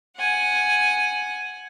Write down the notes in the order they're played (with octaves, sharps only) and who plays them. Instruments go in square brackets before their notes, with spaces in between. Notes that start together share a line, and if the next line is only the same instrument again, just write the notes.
[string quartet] F#5 G#5